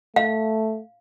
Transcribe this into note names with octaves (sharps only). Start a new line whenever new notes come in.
A3 F5